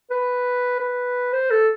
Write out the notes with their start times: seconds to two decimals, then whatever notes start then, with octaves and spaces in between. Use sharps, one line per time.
0.11 B4
0.80 B4
1.33 C5
1.51 A4